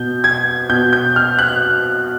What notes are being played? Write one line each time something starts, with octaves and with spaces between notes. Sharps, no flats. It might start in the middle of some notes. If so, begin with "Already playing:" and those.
Already playing: B2 G6
G#6
B2 G6
G6
F6
F#6